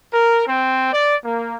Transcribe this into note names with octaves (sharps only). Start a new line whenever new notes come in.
A#4
C4
D5
A#3